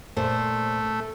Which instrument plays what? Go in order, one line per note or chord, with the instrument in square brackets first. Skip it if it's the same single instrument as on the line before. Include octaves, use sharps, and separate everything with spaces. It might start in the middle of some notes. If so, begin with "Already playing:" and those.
[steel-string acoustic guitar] A#2 C5 [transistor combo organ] A3